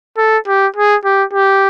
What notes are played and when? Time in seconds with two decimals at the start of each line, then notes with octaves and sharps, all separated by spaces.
0.17 A4
0.47 G4
0.76 G#4
1.04 G4
1.33 G4